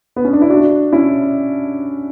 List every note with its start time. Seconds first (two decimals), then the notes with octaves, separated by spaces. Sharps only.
0.16 B3
0.25 C#4
0.33 D4
0.42 E4
0.50 D4 F#4
0.92 C#4 E4